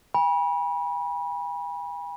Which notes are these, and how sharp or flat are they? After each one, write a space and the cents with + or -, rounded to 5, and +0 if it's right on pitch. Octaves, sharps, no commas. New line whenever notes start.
G#5 -45 B5 -30